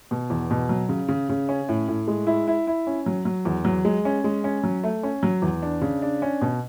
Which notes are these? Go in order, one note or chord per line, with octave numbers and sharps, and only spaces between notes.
B2
E2
B2
F#3
C#3
C#3
C#3
C#4
A2
A2
G#3
E4
E4
E4
C#4
F#3
F#3
E2
F#3
G#3
C#4
G#3
C#4
F#3
A3
C#4
F#3
E2
D4
C#3
D4
C#4
B2